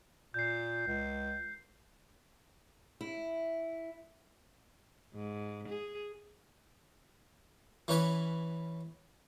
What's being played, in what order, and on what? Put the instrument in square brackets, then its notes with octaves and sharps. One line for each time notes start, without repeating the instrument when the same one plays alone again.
[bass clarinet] A#2 [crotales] G6 C7
[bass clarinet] C#2
[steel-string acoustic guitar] E4
[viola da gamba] G#2
G#4
[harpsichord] E3 C#4 B4 G#5